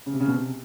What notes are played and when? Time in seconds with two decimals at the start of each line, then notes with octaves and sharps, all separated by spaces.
0.06 C#3
0.13 C3
0.20 C#3
0.27 B2
0.35 C3